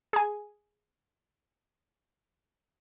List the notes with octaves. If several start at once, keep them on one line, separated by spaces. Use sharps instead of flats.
G#4 G#5